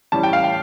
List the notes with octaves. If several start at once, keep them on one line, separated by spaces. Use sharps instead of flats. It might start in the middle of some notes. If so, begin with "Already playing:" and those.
A2 E3 G3 C#4 A5
G5
F5
G5